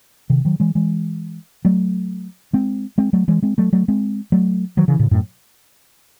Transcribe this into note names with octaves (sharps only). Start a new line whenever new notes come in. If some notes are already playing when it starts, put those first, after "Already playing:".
C3 D#3
D#3 F#3
E3 G#3
E3 G#3
F#3 A3
G#3 C4
G#3 C4
F#3 A3
E3 G#3
G#3 C4
F#3 A3
F#3 A3
G#3 C4
F#3 A3
D#3 F#3
C#3 E3
A2 C#3
F#2 A2